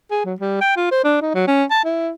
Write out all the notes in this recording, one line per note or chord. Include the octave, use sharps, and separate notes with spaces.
G#4
F#3
G3
G5
F4
C5
D4
D#4
F#3
C#4
A5
E4